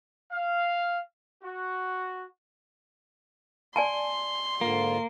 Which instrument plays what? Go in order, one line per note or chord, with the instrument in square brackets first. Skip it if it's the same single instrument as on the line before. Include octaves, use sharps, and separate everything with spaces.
[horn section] F5
F#4
[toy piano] D5 G#5 A5 [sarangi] C6
[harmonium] G#2 D3 F4 [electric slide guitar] A#3